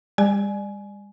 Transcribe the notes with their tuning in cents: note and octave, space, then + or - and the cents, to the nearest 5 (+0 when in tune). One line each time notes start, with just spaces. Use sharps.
G3 +45 D5 +30 G#5 +20